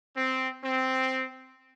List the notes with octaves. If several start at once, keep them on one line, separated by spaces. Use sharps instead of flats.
C4
C4